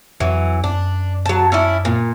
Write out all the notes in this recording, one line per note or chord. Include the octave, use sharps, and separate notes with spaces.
F2 E3 F#3
F#2 D4
F#3 A5
C#4 D4 E4
A#2